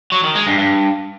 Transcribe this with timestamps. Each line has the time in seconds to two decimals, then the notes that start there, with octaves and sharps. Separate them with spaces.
0.12 F#3
0.23 D#3
0.35 G#3
0.47 G2
0.58 G2